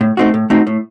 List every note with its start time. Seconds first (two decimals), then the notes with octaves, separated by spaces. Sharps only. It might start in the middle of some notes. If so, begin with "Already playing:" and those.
0.01 A2
0.17 A3 C4 D#4 F#4
0.34 A2
0.50 A3 C4 D#4 F#4
0.67 A2